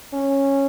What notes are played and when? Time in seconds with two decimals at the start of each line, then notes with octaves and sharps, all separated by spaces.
0.13 C#4